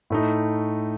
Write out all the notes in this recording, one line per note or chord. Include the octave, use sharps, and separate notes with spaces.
A2 A3 D#4